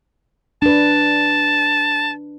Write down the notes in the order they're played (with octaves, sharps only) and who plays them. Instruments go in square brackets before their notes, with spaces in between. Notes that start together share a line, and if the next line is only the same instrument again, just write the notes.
[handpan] D4 B4 [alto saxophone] A5